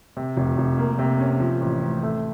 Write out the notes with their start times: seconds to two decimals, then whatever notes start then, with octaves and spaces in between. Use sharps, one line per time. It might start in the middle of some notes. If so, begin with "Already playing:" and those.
0.17 C3
0.37 F1
0.58 F1
0.78 A#3
0.99 C3
1.20 C#4
1.40 F3
1.61 A1
1.82 A1
2.03 A3